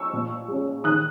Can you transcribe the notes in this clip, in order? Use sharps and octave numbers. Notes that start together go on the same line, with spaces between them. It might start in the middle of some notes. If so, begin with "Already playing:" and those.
Already playing: C#6 E6
A#2
G#3 C#4
D#3 D#6 F#6